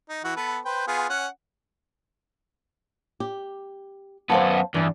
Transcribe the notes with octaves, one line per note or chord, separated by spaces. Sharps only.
D#4
E3 F#4
B3 A4 B4
B4 C5 G5
B3 F4 G#4
C#4 F#5
G4
F#2 B3 C5 F5 A5
E2 G2 G3